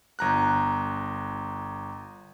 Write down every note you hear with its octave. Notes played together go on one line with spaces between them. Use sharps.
G1 A#5 F#6